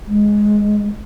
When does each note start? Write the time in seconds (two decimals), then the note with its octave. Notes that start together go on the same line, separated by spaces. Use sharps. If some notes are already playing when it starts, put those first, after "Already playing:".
0.07 G#3